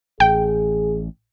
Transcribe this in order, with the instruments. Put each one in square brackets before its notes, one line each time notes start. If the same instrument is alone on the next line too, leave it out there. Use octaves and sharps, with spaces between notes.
[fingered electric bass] A1 [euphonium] G#4 [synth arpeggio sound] G5